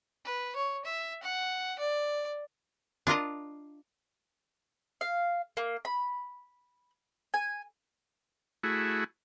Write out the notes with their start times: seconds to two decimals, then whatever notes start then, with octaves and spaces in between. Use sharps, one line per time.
0.25 B4
0.56 C#5
0.85 E5
1.23 F#5
1.79 D5
3.07 D4 F4 A#4 D#5
5.01 F5
5.57 A#3
5.85 B5
7.34 G#5
8.63 A3 E4 F#4 G#4